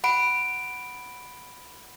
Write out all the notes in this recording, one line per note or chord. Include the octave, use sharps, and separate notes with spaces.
F#5 B5 D7